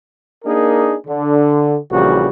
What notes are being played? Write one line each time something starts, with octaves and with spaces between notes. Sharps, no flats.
A#3 D4 D#4 G#4 A#4
D3
A#1 C#3 E3 G3 F#4